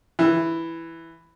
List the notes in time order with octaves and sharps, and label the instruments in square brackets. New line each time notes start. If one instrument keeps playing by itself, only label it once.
[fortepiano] E3